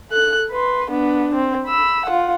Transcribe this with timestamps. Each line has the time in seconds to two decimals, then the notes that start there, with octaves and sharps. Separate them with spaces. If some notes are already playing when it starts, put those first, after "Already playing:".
0.11 A4 F#6
0.51 B4 C6
0.90 B3 D4
1.34 C4
1.67 B5 E6
2.06 F4 F#5